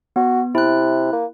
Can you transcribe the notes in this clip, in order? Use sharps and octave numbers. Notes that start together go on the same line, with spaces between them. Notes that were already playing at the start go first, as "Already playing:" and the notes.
B3 F#4
C3 E4 F#6
A#3